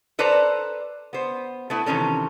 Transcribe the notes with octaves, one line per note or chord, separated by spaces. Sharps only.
A4 B4 C5 D5 A5 A#5
B3 C5
A3 B3 E4
C3 D#3 E3 C#4 A4